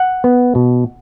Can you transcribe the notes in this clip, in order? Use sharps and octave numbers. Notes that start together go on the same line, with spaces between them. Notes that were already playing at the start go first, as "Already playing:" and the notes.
Already playing: F#5
B3
B2